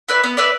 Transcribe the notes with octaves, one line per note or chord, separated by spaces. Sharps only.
E4 B4 D5
B3
E4 B4 D5